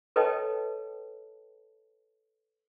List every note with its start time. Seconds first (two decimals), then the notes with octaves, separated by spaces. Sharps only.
0.16 A4 B4 C#5 D#5 G5 A5